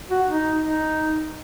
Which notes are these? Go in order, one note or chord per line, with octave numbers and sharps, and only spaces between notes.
F#4
D#4
D#4